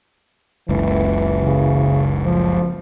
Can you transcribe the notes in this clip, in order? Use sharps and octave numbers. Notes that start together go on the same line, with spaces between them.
F#1 C#2 E3
C#3
F3